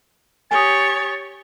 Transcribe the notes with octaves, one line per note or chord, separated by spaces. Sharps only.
G4 C#5 G#5 D#6 A6